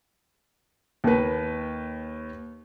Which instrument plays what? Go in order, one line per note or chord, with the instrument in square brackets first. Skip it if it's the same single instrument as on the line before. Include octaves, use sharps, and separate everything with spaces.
[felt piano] D#2 B4